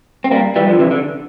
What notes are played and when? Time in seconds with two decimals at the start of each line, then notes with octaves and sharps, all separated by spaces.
0.24 C4
0.31 G3 A#3
0.56 E3 G3
0.67 D3 F3
0.79 C3 E3
0.91 D3